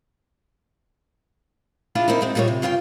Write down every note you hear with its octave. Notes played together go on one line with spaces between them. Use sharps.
D4 E4 F4 G#4
C3 A#3 C4 D#4 E4
G#2 G#3 C4
A#2 G3 G#3 C5 C#5
C3
G2 C#3 F4 F5 G5